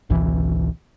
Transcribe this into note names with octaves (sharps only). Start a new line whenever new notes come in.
G#1 C#2 B2 E3